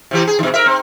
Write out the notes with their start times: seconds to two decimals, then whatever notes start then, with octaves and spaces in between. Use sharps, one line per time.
0.11 C3 E3 G4
0.27 G#4
0.39 B2 D#3
0.54 A#4 E5
0.66 C4